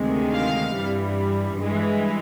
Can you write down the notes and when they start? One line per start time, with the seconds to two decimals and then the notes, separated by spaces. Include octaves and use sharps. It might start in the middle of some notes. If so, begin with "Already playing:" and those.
Already playing: D2 C3 D#3 G#3
0.34 F5
0.75 G2 E3 G3
1.57 G2 E3 G#3